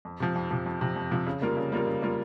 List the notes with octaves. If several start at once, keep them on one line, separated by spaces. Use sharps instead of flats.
F2
C3 F3
F2
C3 F3
F2
C3 F3
F2
C3 F3
C#3
G3 A#3 F4 A#4
C#3
G3 A#3 F4 A#4
C#3
G3 A#3 F4 A#4